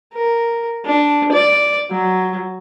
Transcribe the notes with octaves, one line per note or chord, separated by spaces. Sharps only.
A#4
D4
D5
F#3